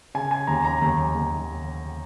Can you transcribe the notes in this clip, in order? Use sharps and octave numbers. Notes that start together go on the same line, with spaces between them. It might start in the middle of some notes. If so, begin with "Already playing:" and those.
C#3 G#5
G#5
D#2 A#5
A#5
D#2
D#2